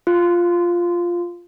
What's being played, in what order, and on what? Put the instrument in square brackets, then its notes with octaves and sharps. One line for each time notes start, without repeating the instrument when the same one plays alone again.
[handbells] F4